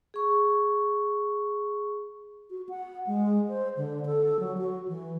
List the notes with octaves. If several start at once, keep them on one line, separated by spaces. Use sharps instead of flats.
G#4 C#6
F#4
F#5
G#3
C5
D3
A4
F#3
F#4
E3